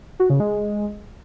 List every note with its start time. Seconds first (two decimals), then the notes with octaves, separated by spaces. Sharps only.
0.20 F#4
0.30 C#3
0.40 G#3